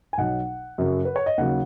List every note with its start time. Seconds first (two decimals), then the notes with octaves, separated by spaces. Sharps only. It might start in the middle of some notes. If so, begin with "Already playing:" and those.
0.13 G#5
0.18 B1 B2 F#3 F#5
0.78 F#2 C#3 F#3
1.05 B4
1.16 C#5
1.26 D#5
1.37 D#2 C#3 F#3 F#5